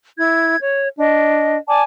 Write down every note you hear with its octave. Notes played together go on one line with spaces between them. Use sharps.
E4 G#6
C#5
D4 D#5
D5 G#5 A5 D6